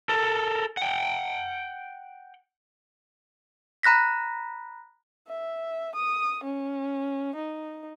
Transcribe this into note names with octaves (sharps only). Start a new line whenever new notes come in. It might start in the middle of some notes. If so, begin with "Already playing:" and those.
A4 A#4
F#5 G5
A#5 B5 F#6 A#6 B6
E5
D#6
C#4
D#4